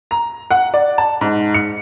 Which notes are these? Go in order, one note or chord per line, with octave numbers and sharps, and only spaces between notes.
A#5
F#5
D5
A5
G#2
C#7